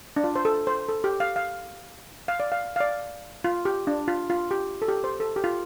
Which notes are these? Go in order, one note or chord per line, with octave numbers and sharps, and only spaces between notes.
D4
F4
C5
A4
C5
A4
G4
F5
F5
F5
D5
F5
F5
D5
F4
G4
D4
F4
F4
G4
A4
G4
C5
A4
G4
F4